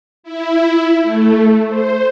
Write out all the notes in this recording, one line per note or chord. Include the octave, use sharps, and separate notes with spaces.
E4
A3
C5